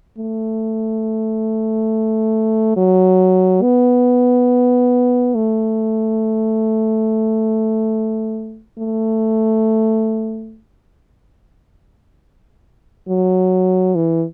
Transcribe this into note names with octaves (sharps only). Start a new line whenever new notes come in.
A3
F#3
B3
A3
A3
F#3
E3